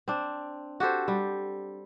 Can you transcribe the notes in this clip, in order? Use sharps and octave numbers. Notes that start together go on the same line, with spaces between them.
C4 D4
F#4 G4 A4 C5
G3